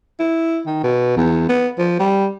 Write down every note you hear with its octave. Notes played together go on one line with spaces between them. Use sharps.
E4
D#3
B2
E2
B3
F3
G3